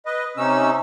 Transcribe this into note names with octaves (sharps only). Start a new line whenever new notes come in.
B4 D#5
C3 C#4 D#4 E6